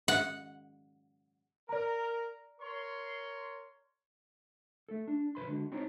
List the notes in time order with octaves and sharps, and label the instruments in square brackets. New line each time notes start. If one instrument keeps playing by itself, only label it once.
[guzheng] F#5
[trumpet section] A#4 [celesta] D5 A#5
[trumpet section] A#4 C#5 C6
[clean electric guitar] A3 A4
D4
B1 F2 C#3 B4 B5 C6
D3 G#3 F#4
C4 D#4 C#5 A#5